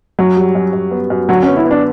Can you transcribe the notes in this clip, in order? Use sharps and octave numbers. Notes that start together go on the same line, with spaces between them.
F#2 F#3
G3
F#2
F#2
B3
F#2
D3 F#3
C#4
B3
E4
B3
D4